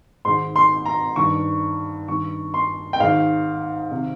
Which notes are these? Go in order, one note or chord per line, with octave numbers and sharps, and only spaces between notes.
G#2 D#3 C6
C6
A#5
G2 D#3 C#6
G2 D#3 C#6
C6
G5
G#2 D#3 F5
C3 D#3